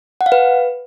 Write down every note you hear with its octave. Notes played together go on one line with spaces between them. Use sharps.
F#5
F5
B4